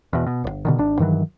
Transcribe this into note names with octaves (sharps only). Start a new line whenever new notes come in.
E2 B2
B2
D1 G1
B2 D3 D#3
G#1 D4
G2 D#3 E3 F#3